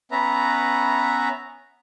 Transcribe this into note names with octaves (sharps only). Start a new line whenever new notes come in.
B3 C#4 B4 E5 A#5